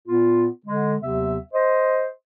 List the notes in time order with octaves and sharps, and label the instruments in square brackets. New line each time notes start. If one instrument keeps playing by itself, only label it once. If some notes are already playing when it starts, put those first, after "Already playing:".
[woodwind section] A#2 B3 F4
D3 G#3
D#2 C3 F#3 B3 E5
C5 D#5